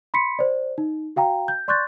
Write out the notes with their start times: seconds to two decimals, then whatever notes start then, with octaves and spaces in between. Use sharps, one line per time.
0.14 B5 C6 B6 C#7
0.39 C5 D5
0.78 D#4
1.16 F#4 F5 G5 A#5
1.48 G6
1.68 D5 C6 C#6 F#6 G6 A6